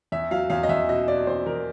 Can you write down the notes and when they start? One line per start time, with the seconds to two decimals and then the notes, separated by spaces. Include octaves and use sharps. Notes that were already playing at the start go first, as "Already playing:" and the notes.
0.12 E2 E5
0.31 F#3 F5
0.50 E2 F5
0.63 D#5
0.69 E2 E5
0.89 B2 D#5
1.08 B2 D5
1.27 E2 C5
1.46 E2 A#4